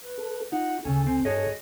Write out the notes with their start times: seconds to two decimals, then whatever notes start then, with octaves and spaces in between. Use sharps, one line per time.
0.04 B4
0.18 A4
0.52 D#4 F4 F#5
0.85 D2 C#3 C#4 A4 G#5
1.07 C4
1.25 G2 F#4 G#4 A4 C#5 D#5